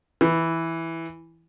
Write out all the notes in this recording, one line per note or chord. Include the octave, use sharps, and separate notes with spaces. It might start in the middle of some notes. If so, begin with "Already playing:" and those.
E3